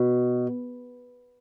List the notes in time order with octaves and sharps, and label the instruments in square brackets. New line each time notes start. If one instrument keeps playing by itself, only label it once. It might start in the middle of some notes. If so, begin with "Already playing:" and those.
Already playing: [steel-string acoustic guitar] B2